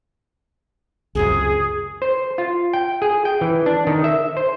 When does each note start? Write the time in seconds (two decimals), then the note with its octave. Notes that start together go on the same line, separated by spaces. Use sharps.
1.15 C#2 F#2 C3 G#4
2.02 C5
2.38 F4
2.73 G5
3.02 G#4
3.25 G5
3.41 E3
3.66 D4
3.87 D#3
4.04 E5
4.37 C5